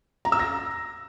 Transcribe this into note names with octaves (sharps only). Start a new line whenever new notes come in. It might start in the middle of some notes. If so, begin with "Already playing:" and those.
A#5
E6
A#6